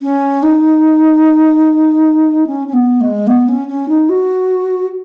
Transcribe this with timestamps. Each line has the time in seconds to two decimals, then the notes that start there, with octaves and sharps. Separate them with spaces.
0.02 C#4
0.43 D#4
2.47 C#4
2.68 C#4
2.73 B3
3.01 G#3
3.27 B3
3.48 C#4
3.68 C#4
3.88 D#4
4.09 F#4